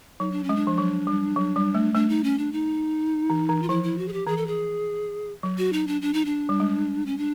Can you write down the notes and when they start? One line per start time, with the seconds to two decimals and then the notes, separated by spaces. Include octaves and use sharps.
0.19 F#3 D#4
0.32 D4
0.44 C#4
0.49 G#3
0.56 D4
0.67 F3
0.78 F#3
1.07 G3
1.36 F#3
1.56 G3
1.74 A3
1.94 A3 D4
2.09 D#4
2.24 C#4
2.38 D4
2.52 D#4
3.30 E3
3.49 E3
3.62 F4
3.69 F3 E4
3.83 E4
3.98 F#4
4.08 G#4
4.13 G4
4.27 E3 G#4
4.37 A4
4.47 G#4
5.43 F#3
5.58 F#4
5.73 D#4
5.87 D4
6.02 D4
6.13 D#4
6.25 D4
6.49 G3
6.60 G#3
7.06 C#4
7.18 D4